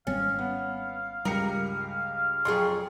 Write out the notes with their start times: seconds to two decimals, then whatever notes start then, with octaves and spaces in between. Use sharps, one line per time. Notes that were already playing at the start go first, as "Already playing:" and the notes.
0.07 G#1 G3 C4 C#4 F5
0.39 B3
1.25 C#2 G2 G3 G4 A#4 C#7
2.45 F2 F#3 G#4 C6 C#6